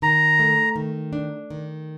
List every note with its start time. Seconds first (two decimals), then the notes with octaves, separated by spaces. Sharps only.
0.02 D#3 A#5
0.39 A3
0.76 D#3
1.13 D4
1.50 D#3